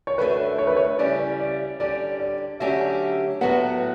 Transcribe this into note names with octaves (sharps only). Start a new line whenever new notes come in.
C#5
F#2 D3 A3 B4
C#5
B4
C#5
C#3 G3 C#4 E4 D5
D5
D3 G3 C#4 G4 D5
D5
D3 F#3 A3 C#4 G4 E5
A2 F#3 B3 F#5